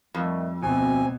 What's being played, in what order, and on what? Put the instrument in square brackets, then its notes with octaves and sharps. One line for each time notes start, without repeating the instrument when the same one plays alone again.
[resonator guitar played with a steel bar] F2 [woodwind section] D#3 G3 A3
[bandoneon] D2 G#5 [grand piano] B2 [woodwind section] C4